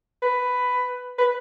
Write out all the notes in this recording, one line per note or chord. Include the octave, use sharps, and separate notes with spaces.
B4
B4